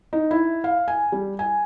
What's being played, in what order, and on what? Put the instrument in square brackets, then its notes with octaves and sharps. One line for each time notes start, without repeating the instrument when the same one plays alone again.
[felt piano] D#4
E4
F5
G#5
G3
G#5